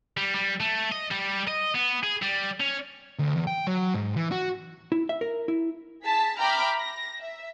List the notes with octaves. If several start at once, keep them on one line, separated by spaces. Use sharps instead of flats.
G3
G3
A3
D#5
G3
D#5
B3
G#4
G3
C#4
D2
E2
G5
F#3
G#2
E3
F#4
E4
E5
A#4
E4
G#4 A5 B6
E5 G5 A#5 B5 D6 F6
A#6
E5